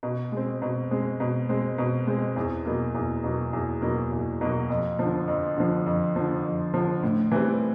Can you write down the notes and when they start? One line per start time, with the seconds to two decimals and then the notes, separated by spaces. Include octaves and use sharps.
0.03 B2
0.32 G#3 C4
0.62 B2
0.91 G#3 C4
1.20 B2
1.49 G#3 C4
1.78 B2
2.07 G#3 C4
2.36 E2
2.66 B2 F#3 A#3
2.95 E2
3.24 B2 F#3 A#3
3.53 E2
3.82 B2 F#3 A#3
4.12 E2
4.41 B2 F#3 A#3
4.70 F2
4.99 D3 F3
5.28 F2
5.57 D3 F3
5.86 F2
6.16 D3 F3
6.45 F2
6.74 D3 F3
7.03 A2
7.32 E3 G3 C4